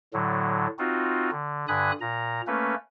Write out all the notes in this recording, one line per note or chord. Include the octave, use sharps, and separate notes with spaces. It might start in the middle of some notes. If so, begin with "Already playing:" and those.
A2 D3 F#3
C4 D#4 F4 F#4
D3
G2 D3 G#5 B5 D#6 F#6
A#2 A#5
A3 A#3 C#4 B4